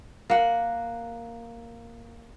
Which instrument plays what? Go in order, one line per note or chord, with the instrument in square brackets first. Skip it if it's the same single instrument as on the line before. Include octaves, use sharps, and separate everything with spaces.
[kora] A#3 F#5